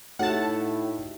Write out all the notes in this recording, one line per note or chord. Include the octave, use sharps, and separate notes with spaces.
A2 D#4 F#4 G4 E5 F#5 A5